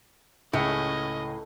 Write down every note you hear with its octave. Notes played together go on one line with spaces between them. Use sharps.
C#2 A2 C#4 G#4 D#5 C#7